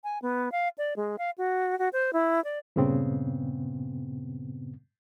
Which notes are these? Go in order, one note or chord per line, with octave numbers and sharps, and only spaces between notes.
G#5
B3
F5
D5
G#3
F5
F#4
F#4
C5
E4
D5
G2 A#2 C#3 B3 C4